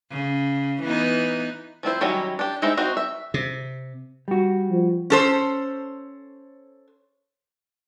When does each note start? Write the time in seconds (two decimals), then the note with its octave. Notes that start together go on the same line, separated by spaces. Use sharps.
0.11 C#3
0.82 E3 B3 D#4
1.83 F3 C4 E4 C5
2.01 D#3 F#3 G3 C#4 E4
2.39 D4 G4
2.62 G#3 D#4 E4 C5 E5
2.77 C4 D#4 F#4 C5
2.97 E5
3.34 C3
4.28 G3 F#4
4.70 F3
5.10 C#4 A4 C5